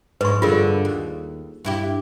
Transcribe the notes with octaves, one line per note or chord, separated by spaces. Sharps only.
G#2 B4 C#6
G2 D3 F4 G#4 A#4
D#2
G2 E4 G4